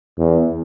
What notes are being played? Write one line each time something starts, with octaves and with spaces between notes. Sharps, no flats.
E2